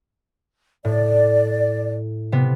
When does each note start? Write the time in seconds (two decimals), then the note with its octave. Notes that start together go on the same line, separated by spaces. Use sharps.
0.85 A2 D5
2.32 C3 B3